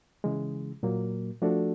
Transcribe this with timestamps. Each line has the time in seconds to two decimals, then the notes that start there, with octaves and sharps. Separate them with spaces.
0.24 C#3 E3 G#3
0.83 A#2 F#3 A#3
1.42 F3 A3 D4 F#4 A4